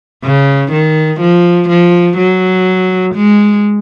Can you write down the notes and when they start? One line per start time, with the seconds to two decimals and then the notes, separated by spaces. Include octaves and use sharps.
0.24 C#3
0.73 D#3
1.21 F3
1.69 F3
2.18 F#3
3.15 G#3